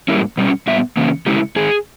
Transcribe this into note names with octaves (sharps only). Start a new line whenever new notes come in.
G#2 G3 A#3 C#4 E4
B2 G3 C#4
A#2 G3 B3 E5
C#3 E3 A#3 C#4
C#3 G#3 C#4 E4 G4
G#2 D#3 G#3 G#4